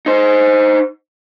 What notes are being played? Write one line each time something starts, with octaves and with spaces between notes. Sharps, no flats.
D#4 C5